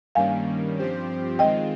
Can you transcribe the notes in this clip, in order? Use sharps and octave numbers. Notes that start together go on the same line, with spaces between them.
G2 D#3 G3 A#3 C#4 F5 G#5
G2 F3 C4 G4 C5
D#3 G#3 C4 F4 D#5 G5